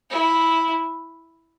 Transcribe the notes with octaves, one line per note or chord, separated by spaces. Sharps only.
E4